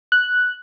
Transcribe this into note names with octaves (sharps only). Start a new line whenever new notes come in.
F#6